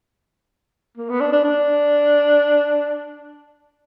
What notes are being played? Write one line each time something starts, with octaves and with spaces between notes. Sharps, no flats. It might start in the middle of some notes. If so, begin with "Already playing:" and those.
A#3
B3
D4
D4
D4